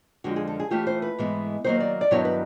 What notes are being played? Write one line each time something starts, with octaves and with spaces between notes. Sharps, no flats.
F2 D3 F3 G#3 C#4 F#4
G#4
A4
G#4
E3 A3 C#4 F4 G4
C5
B4
G#2 E3 G#3 B3
D#3 F#3 A#3 C5
D5
D5
G2 D#3 F#3 B3 E4 C#5
B4